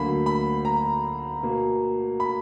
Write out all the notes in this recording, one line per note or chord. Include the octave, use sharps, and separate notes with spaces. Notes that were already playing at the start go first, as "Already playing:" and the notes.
Already playing: D2 D3 F#3 A#3 B5
B5
A#5
B2 A#3
B5